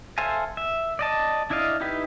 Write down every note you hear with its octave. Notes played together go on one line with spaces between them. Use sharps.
A4 C5 E5 F5 G#5
E5
D5 D#5 A5
D4 E4 D5 D#5 F5
D#4 E4 G4 B4